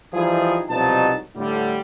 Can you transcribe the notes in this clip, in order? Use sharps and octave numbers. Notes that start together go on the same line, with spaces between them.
E3 F3 G3 D#4 E4 G#4
C2 B2 F3 F#3 D#4 A5
A2 D3 G3